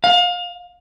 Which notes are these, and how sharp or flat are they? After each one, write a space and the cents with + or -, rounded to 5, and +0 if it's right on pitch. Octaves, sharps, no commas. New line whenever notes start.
F5 +30